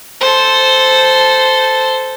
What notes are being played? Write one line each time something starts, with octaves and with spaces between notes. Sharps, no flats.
A4 C5